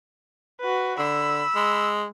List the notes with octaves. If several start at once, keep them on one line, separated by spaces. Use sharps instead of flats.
F#4 B4
D3 B5 E6
G#3